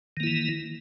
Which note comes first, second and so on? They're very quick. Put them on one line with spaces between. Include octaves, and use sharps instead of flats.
D#3 A#3 E4 E3